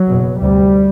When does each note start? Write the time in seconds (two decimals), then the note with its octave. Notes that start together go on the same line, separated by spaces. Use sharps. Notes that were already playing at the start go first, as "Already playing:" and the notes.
Already playing: F#3
0.08 F#1 E2 B2
0.41 D2 C3 G3